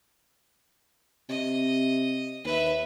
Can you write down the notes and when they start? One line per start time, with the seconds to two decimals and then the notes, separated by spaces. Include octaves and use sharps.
1.29 C3 D#5
2.44 D#2 B4 E5